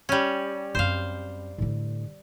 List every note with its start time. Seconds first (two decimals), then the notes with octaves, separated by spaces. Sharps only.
0.09 G3 C#4
0.75 F#2 C4 C5 F5
1.58 A2 D3